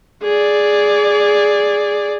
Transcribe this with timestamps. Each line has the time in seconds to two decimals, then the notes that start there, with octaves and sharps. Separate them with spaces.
0.23 G#4 D5